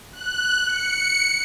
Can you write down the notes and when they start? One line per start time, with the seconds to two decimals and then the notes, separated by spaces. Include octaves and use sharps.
0.12 F#6
0.67 C#7